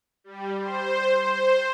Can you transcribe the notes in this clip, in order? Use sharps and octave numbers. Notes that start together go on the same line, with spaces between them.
G3
C5
C5